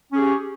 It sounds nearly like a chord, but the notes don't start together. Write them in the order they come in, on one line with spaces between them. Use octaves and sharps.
C#4 G#4 G4